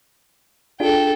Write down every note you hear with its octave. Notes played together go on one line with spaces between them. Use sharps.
D4 F4 G#4 A4 G5